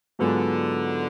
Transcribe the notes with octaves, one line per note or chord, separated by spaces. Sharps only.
G#2 D3 F#3 B3 F4 G#4